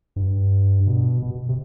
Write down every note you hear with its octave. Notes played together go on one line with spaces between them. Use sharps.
G2
B2
B2
C3